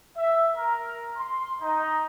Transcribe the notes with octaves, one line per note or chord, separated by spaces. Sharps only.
E5
A#4
C6
D#4